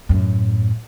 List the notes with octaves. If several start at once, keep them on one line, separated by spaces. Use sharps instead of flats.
F#2 A2